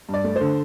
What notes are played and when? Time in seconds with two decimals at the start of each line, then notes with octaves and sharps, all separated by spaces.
0.09 G2 D5
0.24 A3
0.36 D3 C5